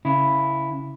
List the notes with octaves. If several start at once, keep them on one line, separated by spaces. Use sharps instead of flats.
C#3 E4